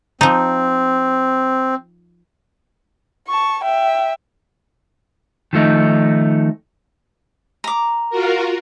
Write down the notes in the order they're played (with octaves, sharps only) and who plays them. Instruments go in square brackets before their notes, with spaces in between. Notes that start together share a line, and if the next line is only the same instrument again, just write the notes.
[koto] F3 D#4 [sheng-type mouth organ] C4
[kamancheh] A5 C#6
E5 G5
[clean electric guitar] D#3 F3 A3 D#4
[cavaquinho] A#5 D6
[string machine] F4 F#4 A#4